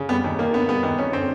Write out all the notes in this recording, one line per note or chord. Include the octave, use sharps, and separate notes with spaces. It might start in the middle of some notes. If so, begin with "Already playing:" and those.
Already playing: C#3
G3 B3
D#2
D#2 A#3
D3 B3
G3 B3
D#2 B3
D#2 C#4
D3 C4